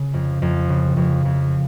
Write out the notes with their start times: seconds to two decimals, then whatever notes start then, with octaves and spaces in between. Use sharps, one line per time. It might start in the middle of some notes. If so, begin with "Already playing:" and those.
Already playing: C#3
0.14 F2
0.42 F2
0.69 C#3
0.97 F2
1.25 F2